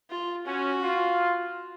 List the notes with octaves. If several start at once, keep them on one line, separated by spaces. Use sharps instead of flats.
F4
C#4 F#4
F4